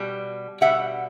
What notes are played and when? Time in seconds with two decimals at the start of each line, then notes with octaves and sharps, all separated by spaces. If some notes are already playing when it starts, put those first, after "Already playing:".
Already playing: B2 G3
0.61 B2 G3 E5 F#5